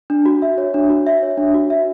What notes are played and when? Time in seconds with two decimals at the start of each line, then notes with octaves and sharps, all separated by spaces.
0.10 D4
0.26 F#4
0.42 E5
0.58 C#5
0.74 D4
0.90 F#4
1.06 E5
1.23 C#5
1.38 D4
1.54 F#4
1.70 E5